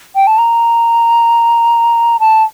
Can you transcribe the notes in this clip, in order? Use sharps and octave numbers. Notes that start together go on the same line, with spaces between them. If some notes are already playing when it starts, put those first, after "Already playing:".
G5
A5
A#5
A5